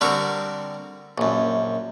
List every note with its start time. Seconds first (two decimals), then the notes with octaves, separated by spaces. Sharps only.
0.01 D3 G3 C4 F#4 A#4
1.18 A#1 F#2